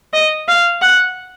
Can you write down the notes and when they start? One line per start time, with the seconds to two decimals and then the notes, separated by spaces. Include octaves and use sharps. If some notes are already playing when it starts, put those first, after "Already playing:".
0.13 D#5
0.48 F5
0.82 F#5